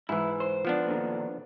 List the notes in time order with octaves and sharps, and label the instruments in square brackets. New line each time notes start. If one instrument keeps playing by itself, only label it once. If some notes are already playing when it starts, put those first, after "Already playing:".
[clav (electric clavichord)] G#2 E3 [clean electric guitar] E4
[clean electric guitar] C5
[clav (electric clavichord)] F3 B3 D4
[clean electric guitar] A#2 D3 D#3